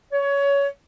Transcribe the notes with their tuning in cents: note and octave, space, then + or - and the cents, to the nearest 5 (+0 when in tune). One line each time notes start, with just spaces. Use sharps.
C#5 +20